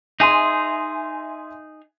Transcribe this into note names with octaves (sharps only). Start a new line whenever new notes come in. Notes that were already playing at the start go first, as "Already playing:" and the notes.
D#4 G#4 E5 G#5 C6